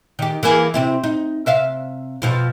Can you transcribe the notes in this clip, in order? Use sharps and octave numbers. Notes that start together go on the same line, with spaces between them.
D#3 G4
E3 A#3 G#4
C3 C4 E4
D#4
C3 E5 F5
F2 B2 F3